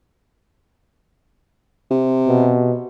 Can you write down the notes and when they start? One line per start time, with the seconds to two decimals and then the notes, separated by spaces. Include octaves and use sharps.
1.90 C3
2.28 B2